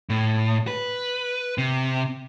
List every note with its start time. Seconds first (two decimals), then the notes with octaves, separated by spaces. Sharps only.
0.09 A2
0.67 B4
1.58 C3